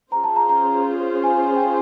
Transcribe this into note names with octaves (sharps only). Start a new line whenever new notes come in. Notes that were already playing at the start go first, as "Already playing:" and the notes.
C#4 F4 G#4 C5 A#5
A5
A#5
A#5
G#5
G5
G#5